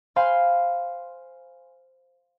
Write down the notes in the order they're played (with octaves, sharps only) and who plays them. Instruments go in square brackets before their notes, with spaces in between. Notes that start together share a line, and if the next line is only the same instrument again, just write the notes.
[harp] C5 F5 G#5 B5 C6